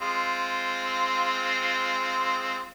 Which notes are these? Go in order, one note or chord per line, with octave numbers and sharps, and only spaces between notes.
G#3 C4 F4